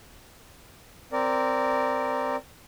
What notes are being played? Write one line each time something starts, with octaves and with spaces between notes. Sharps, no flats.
C4 A#4 D5